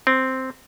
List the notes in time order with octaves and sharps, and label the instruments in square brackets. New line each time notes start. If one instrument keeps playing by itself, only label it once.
[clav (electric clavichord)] C4